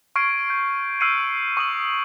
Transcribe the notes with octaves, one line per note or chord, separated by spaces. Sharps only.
C#6 F6 G#6 C7 D7
G6
E6 F6 G6 C7 C#7 D#7
C#6 D#6 F#7